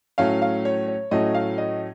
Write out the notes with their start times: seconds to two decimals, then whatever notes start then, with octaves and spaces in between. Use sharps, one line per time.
0.18 A2 F#3 A3 C#4 F5
0.42 F5
0.65 C#5
0.88 C#5
1.11 A2 F#3 A3 C#4 D#5
1.34 F5
1.58 D#5